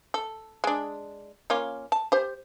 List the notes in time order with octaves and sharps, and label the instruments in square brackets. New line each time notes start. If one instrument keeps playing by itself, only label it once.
[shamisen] A4
G#3 D4
A#3 C#4 F4
A5
G4 C5